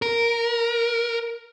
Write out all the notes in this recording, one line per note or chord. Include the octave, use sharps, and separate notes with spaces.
A#4